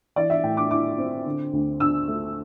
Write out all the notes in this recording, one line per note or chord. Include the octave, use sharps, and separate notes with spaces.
E3 D5
E5
A2 G5
D6
E4 D6
C4
D3
D2
D4 E6
A3